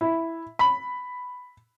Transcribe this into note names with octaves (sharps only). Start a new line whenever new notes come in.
E4
B5